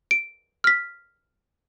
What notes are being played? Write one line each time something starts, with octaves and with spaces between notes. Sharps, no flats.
D7
F6 B6